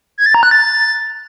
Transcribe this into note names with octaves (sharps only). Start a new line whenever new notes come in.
G#6
A6
A#5
F#6
A6